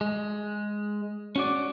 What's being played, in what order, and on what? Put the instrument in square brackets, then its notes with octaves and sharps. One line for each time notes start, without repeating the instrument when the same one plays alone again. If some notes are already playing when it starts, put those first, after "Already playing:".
[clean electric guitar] G#3
C#4 F#4 D5